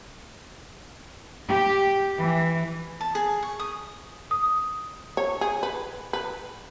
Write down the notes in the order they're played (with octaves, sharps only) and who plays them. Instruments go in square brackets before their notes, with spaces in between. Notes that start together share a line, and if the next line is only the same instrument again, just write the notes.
[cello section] G4
E3
[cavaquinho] A5
G#4
C#6
D#6
[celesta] D#6
[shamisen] C#5
G#4
B4
B4